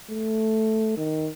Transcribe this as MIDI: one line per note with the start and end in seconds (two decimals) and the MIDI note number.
0.10 0.93 57
0.97 1.30 51